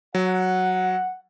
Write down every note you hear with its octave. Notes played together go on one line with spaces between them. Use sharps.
F#3 F#5